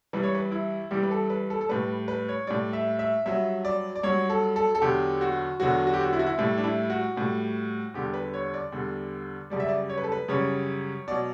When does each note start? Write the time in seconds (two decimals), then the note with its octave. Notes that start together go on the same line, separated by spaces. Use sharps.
0.13 G2 E3 G3 B4
0.23 C#5
0.35 B4
0.52 E4
0.91 G2 E3 G3 G4
1.03 B4
1.11 A4
1.30 B4
1.50 A4
1.61 A4
1.69 A2 G3 B4
2.08 B4
2.29 C#5
2.47 A2 G3 D5
2.73 E5
2.99 E5
3.26 G2 F#3 E5
3.65 D5
3.96 D5
4.03 G2 F#3 C#5
4.30 A4
4.56 A4
4.75 A4
4.82 E2 D3 F#3 G4
5.21 F#4
5.60 E2 D3 F#3 F#4
5.87 F#4
5.94 G4
6.01 F#4
6.13 E4
6.19 F#4
6.26 E4
6.38 A2 G3 E4
6.58 D4
6.64 E4
6.90 F#4
7.16 A2 G3
7.94 E2 D3 G3 G4
8.14 B4
8.34 C#5
8.54 D5
8.72 E2 D3 G3
9.50 F#2 C#3 G3 D5
9.60 E5
9.69 D5
9.89 C#5
9.98 B4
10.04 A4
10.12 B4
10.28 F#2 C#3 G3 C#5
11.08 B2 F#3 D5